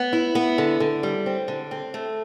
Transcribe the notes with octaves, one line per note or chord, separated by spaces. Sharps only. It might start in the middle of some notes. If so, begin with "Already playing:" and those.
Already playing: B3
E4
B3
D3
D3
G3
C4
D3
C4
A3